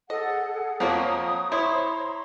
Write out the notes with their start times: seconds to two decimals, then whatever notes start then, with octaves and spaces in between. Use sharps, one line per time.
0.10 G#4 A4 D#5 F#5
0.80 F2 F3 A#3 F4 F#4 C#5 A#5 D#6
1.52 E4 C5 C#5 A#5 C6